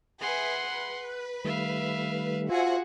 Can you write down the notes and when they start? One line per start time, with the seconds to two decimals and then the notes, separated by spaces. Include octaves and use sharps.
0.21 G#4 B4 E5 F#5 C6
0.70 B4 F#6
1.44 D#3 G3 A3 E5 F5
2.49 F4 F#4 G#4 C5 E5 F#5 G#5